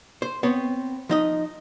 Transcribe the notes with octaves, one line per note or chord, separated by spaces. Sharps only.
C5
B3 C4 C#5
F3 D#4 D#5